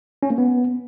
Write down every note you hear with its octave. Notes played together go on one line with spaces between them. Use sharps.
C#4
A#3
B3